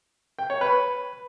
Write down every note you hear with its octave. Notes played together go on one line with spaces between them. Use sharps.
G5
C#5
B4